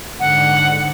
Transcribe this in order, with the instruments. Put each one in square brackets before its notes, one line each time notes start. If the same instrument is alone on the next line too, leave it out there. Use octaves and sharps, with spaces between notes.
[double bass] G#2 D3 [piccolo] F#5